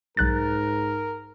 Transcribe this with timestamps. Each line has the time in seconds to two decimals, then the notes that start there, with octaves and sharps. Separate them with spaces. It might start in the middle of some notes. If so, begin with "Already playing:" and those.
0.17 B1 G#2 A#4 F#6 A6